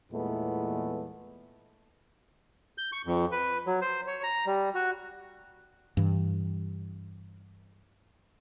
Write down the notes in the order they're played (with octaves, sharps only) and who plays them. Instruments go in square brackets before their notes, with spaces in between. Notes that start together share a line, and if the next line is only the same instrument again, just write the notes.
[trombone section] E2 A#2 E3 G#3 A3 B3
[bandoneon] G6
C#6
F2
B4
F#3
C5
C#5
A#5
G3
F#4
[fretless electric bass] G2 E3